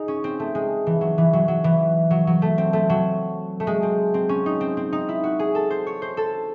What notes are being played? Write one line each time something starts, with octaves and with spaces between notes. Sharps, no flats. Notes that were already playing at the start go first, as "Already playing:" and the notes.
Already playing: D#4 G#4
C#4
C4
A3
G#3
E3
F#3
E3
F#3
F#3
E3
F#3
F#3
A3
C4
A3
F#3
A3
G#3
C4
C4
C#4
D#4
C4
C4
D#4
E4
F#4
G#4
A4
C5
C#5
C5
A4